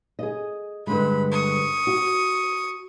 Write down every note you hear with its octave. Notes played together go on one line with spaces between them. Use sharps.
G#4 D#5
G2 D3 G#3 B5
C#6 D#6
F#4